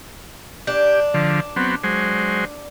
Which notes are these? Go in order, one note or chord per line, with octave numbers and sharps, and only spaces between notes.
D4 G4
D3 F3
F#3 B3 C4
F#3 G#3 C5